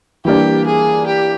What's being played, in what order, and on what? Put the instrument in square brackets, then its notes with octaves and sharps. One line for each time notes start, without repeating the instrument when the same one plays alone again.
[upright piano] E3 G3 A#3 D4 [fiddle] G4
[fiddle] G#4
G4